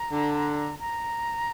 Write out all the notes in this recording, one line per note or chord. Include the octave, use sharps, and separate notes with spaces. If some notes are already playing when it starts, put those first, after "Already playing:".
Already playing: A#5
D3
A#5